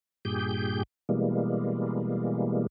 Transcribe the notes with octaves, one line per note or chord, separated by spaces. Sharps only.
G2 A#2 G4 G#4 G6
B2 E3 G3 G#3 A#3